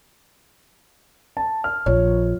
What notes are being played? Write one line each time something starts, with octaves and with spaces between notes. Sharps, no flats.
A5
F6
A#1 C#5